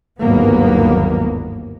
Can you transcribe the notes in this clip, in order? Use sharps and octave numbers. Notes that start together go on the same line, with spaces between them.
G1 D#2 G#2 F#3 A#3 B3